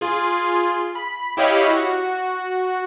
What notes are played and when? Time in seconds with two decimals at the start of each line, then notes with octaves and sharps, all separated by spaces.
0.01 F4 G#4
0.95 B5
1.37 E4 G4 C#5 D#5 F5 B5
1.68 F#4